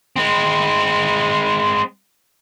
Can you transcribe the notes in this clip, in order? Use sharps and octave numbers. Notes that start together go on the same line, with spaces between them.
G#3 C4